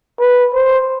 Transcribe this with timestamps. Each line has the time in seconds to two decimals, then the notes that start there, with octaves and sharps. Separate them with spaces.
0.19 B4
0.54 C5